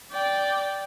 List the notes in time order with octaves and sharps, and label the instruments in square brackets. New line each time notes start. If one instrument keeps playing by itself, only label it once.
[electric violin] D5 G5